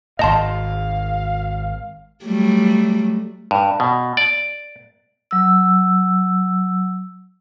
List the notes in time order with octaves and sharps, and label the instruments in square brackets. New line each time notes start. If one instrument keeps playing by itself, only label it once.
[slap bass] G#1 G#2 [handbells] D#5 A5 C6 [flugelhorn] F5
[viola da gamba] F#3 G3 A3
[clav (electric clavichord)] G2
B2
D5
[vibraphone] F#3 E6